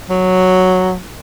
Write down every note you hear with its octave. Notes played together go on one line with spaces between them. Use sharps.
F#3